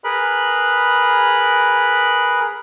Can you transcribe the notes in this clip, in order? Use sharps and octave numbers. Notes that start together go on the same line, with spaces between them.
G#4 A#4 B4 B5